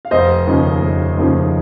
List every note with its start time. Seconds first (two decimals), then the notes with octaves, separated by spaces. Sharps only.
0.05 F5
0.11 F1 C5 D#5
0.47 D#2 C#3 F3
0.82 F1
1.18 D#2 C#3 F3